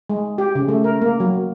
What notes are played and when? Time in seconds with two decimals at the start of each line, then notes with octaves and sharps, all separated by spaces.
0.10 G#3
0.38 G4
0.55 C#3
0.68 A3
0.84 A#4
1.02 A#3
1.20 F#3